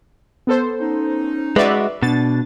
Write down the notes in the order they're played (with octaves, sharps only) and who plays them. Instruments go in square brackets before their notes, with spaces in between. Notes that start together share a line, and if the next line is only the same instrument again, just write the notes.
[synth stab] B3 A4 C5
[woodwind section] C#4 D#4
[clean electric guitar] G#3 F#4 [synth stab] B4 D5 E5
[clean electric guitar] B2 [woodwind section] D4 [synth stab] A6